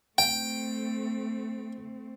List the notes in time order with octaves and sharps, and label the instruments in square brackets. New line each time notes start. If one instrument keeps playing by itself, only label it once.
[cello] A3 C4 [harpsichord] G5